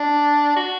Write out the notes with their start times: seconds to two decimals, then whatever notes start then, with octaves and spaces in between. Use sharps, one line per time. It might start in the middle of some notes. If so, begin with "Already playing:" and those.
Already playing: D4
0.57 F#4